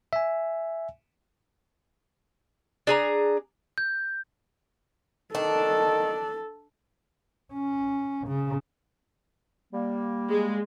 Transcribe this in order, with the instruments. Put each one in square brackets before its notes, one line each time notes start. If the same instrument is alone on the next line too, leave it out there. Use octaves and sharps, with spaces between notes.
[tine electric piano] E5 G#5
[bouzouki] D4 G#4 A#5
[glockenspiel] G6
[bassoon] D#3 [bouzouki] D4 [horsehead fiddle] A4
[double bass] C#4
C#3
[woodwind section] G3 A#3
[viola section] G#3